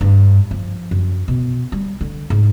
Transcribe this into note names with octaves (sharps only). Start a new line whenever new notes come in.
G2
F3
F#2
B2
G3
D3
G#2